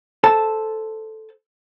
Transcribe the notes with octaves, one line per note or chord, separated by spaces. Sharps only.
A4 C5 A5